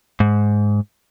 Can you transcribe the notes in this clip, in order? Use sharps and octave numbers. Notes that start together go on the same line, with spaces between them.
G#2